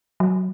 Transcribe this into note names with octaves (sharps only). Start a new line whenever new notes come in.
F#3